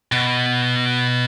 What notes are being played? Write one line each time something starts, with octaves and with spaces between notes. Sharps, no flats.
B2